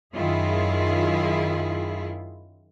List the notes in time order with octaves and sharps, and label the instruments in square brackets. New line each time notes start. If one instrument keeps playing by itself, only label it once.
[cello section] F#2 D#3 E4 F4 G#4